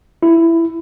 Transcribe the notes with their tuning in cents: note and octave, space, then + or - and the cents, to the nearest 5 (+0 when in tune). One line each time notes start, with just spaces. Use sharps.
E4 +10